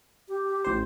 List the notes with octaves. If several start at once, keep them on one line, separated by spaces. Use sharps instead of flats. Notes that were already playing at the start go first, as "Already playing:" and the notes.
G4
A1 C5